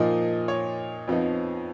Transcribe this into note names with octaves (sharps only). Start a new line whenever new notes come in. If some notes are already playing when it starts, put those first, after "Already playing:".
Already playing: A#2 F3 A#3 D#4 D#5
C#5
F2 F3 B3 D#4